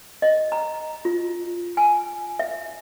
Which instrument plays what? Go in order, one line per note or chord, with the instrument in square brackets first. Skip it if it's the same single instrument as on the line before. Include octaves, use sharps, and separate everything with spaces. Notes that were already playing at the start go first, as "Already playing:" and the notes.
[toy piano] D#5
A#5
F4
G#5
E5